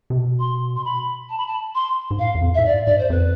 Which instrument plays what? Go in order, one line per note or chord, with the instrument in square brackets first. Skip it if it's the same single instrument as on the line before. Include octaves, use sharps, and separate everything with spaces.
[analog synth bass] C3
B2
[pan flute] C6
C6
B5
A5
B5
A5
C6
[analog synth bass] G#2
[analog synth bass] A2 [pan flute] F5
[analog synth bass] E2
F2
[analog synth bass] A2 [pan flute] E5
[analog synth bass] G#2 [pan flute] D5
[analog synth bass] G#2 [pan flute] D5
[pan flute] C5
[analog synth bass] F2 [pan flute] B4